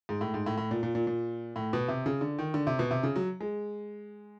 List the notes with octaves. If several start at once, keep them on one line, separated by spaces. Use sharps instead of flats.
G#2
A2
G#2
A2
A2
A#2
A#2
A#2
A#2
A2
B2
C3
C#3
D3
D#3
D3
C3
B2
C3
C#3
F#3
G#3